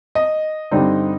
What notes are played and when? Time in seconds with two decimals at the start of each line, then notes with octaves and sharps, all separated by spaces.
0.15 D#5
0.71 G2 D3 G3 C4 D#4